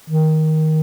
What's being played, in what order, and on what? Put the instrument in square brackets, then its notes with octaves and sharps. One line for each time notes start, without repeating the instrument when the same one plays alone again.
[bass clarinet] D#3